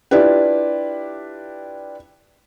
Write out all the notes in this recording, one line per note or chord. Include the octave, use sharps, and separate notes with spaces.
D4 E4 F4 G4 B4